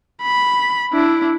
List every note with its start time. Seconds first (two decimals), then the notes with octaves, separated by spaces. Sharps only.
0.22 B5
0.93 D4 E4